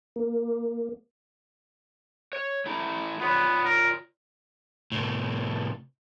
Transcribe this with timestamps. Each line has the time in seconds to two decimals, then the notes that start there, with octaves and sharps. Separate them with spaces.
0.16 A#3
2.33 C#5
2.66 A3 E4 A#5
3.21 B3 F4 C#5 D5
3.65 A#4
4.92 A2 C3